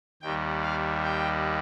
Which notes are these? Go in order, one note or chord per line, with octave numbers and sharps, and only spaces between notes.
D#2 D#3 G3 G5
F5
G5